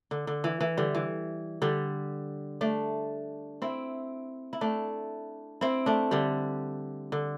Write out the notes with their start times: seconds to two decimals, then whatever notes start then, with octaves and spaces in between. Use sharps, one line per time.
0.11 D3
0.27 D3
0.44 E3
0.61 E3
0.77 D3 G3
0.95 E3
1.62 D3 G3
2.61 A3 D4
3.62 C4 E4
4.53 E4
4.61 A3 D4
5.61 C4 E4
5.86 A3 D4
6.11 D3 G3
7.12 D3